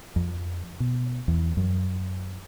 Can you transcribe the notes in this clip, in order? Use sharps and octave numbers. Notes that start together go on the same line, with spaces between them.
F2
B2
E2
F#2